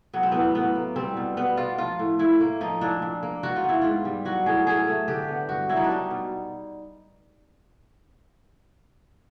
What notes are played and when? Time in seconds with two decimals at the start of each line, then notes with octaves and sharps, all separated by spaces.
0.13 F#3 B3
0.23 C4
0.32 A2 B3
0.55 A2 B3
0.75 A#3
0.96 G3 C4
1.17 B2
1.37 B2 B3
1.57 A#3 F4
1.78 F3 F4
1.99 A2
2.19 A2 E4
2.40 A#3
2.61 F3 D#4
2.81 A#2 D4
3.02 A#2
3.23 A#3
3.43 D#3 F#4
3.56 F4
3.64 B3 E4
3.82 G#2 F4
4.05 G3
4.25 F#3 F#4
4.46 A2 G#4
4.67 A2 G#4
4.87 A3
5.08 D3 G4
5.28 B3
5.49 G2 F#4
5.69 F#3 E4
5.77 D#4
5.84 D4
5.90 G3 D#4
6.11 B2